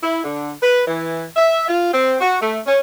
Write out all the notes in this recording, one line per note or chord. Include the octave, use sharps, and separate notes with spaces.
E4
D3
B4
E3
E5
F4
C4
F#4
A3
C#4